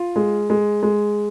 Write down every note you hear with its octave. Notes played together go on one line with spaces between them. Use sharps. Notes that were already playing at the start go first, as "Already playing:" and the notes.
Already playing: F4
G#3
G#3
G#3